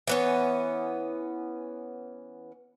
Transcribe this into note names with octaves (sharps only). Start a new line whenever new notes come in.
E3 B3 C#4